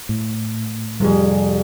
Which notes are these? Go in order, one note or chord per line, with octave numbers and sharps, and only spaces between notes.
A2
F2 C3 G3 G#4